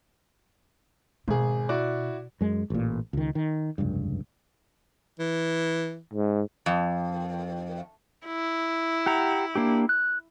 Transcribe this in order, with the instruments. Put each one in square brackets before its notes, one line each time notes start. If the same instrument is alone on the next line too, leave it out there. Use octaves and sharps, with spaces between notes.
[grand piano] G#1 G#4 [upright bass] B2
[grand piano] E4 F#4 D5
[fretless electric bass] F#2 G#3
A1 A#2
C#2 D#3
D#3
F1 C#2 G2
[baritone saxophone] E3
[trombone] G#2
[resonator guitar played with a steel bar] F2
[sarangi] E4
[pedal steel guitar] G4 F#5 A#5
A#3 D4 G4
F#6